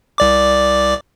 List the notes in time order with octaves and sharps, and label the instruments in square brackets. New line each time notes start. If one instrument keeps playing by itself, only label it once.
[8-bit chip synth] C2 D5 D6